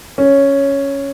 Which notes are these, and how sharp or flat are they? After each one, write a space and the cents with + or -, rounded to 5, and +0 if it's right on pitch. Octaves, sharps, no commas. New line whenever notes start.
C#4 +0